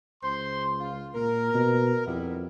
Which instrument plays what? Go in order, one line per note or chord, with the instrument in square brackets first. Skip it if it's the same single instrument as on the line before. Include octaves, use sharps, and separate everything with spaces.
[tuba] C#2 [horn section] C5 C6
[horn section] F4
[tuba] A#2 [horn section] A#4
[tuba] B2
[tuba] F2 [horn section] G3 B3 E4